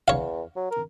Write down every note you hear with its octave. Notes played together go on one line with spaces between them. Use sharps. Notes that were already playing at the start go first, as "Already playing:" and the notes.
E2 C#5 F5
F#3
A#4